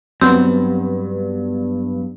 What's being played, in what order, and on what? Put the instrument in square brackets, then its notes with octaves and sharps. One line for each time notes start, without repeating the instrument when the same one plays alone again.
[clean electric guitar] G2 [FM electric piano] F#3 B3 [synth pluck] C4